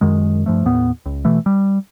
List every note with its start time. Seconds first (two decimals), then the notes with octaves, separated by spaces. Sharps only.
0.01 F#2 D#3 G#3
0.46 G2 F3 A3
0.65 D#2 A2 B3
1.06 C#2
1.25 B2 E3 A3
1.46 G3